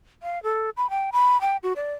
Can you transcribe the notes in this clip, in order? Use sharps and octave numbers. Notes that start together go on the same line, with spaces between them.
F5
A4
B5
G5
B5
G5
F#4
D5